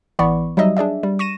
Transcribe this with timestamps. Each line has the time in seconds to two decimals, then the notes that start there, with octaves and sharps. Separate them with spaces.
0.19 A1 E3 B3 D5 B5 C#6
0.57 F#3 G3 D#4 D#5 E5
0.77 D4 G#4 D5 E5
1.03 G3
1.19 C#6 A#6 D#7 E7